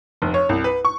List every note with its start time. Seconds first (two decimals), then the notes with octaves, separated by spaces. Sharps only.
0.22 F1
0.34 C#5
0.49 C2
0.64 B4
0.85 C#6